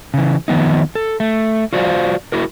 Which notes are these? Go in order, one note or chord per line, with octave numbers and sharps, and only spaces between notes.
C#3 E3
D#3 F3 B3 D#4
A4
A3
F4 F#4 C5 D5 F5
E4 F#4 A#4